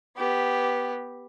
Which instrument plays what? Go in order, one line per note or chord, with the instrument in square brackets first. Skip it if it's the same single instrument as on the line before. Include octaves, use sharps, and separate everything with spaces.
[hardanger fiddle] B3 G4